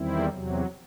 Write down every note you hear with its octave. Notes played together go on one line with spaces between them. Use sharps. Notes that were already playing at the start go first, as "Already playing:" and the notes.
Already playing: E2 D#3 G3 C4 E4
E2 C3 F#3